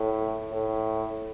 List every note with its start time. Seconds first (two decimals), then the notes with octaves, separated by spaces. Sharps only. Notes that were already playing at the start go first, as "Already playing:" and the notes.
Already playing: A2
0.51 A2